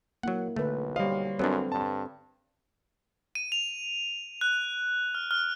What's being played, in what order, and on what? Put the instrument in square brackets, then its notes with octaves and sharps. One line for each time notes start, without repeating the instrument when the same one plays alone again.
[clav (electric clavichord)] F#3 F#5 [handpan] A#3 E4
[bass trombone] B1 [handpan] D3 B4 [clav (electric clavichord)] A3
[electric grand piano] G3 F5 [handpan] C5 C#5 [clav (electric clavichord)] D#5
[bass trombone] F#2 [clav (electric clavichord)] F#3 B3 D4 [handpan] C4 A4 C5
[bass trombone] G2 [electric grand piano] A5
[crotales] D#7
F7
F#6
F6
F6